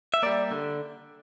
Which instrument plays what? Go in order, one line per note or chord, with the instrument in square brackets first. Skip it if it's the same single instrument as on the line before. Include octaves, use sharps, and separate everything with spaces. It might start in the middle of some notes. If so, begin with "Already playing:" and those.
[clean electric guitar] E5
G3 A#3 D5
D3